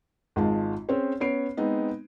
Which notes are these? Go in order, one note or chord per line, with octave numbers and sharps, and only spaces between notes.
G#1 G#3 F4 A5
C4 C#4 G#4 C5 C#5
B3 C#4 C#5 C7 D7
G#3 B3 C4 D#4